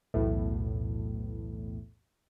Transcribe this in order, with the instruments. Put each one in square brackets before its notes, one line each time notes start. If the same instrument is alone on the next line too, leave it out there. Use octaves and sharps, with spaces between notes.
[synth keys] B1 E2 A2